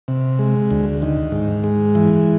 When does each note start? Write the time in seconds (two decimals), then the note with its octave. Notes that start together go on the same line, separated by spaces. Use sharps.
0.08 C3
0.39 G#3
0.71 D2
1.02 D#3
1.32 G#2
1.64 G#3
1.95 E3